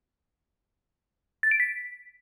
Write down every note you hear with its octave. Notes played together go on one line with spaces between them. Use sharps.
A6
D7
B6